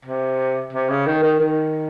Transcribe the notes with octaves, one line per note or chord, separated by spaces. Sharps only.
C3
C3
C#3
D#3
D#3
D#3